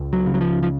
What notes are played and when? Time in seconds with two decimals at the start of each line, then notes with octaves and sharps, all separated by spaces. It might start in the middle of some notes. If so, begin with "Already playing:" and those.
Already playing: C#2
0.13 F#3
0.26 C#3
0.34 F#3
0.41 F3
0.63 F3